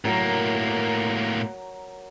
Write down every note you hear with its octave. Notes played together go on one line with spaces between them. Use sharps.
A2 F#3 A#3 A#4